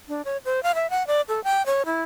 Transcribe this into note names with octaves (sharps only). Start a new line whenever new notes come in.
D4
C#5
C5
F5
E5
F#5
D5
A4
G5
C#5
E4